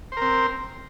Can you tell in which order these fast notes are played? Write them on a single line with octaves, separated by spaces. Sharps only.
C5 A#4 C4